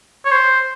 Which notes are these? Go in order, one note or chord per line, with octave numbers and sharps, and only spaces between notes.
C#5
C5